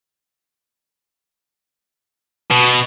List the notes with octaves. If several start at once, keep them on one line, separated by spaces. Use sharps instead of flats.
B2